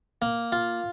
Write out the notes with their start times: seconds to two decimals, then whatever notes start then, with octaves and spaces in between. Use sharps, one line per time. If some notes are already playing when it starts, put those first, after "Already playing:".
0.22 A#3
0.52 F4